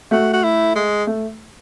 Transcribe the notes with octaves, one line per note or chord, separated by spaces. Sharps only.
A3 F#4
F#4
E4
G#3
A3